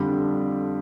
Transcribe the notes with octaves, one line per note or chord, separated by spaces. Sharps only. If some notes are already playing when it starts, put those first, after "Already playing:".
Already playing: F2 D3 G3 D4